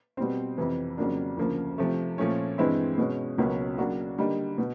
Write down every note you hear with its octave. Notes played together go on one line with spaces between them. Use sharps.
B2 G3 C4
F2 C3 E3
F2 C#3 F#3 A#3 D4
D2 C#3 F3 A#3
C3 F3 A3
A#2 F3 A3 C#4
G2 E3 G#3 C4 E4
B2 G#3 C#4
C#2 B2 F#3 A#3 C#4
C#3 F#3 A#3 D4 F#4
D3 G3 A#3 D#4
B2